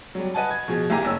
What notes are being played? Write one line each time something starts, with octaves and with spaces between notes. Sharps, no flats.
F#3 G3
B4 D#5 F#5 G#5 A5
G#6
B2 F3 G#4 G#6
C2 A#3 G4 G#5 A#5
F#1 C#4 E6